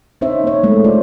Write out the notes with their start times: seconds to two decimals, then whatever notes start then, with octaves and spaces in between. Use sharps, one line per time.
0.21 C4 C#4 D#4 C5 C#5 E5
0.44 A#3 C#5
0.63 G#3 A3 B3
0.85 G3 F4 C5 D5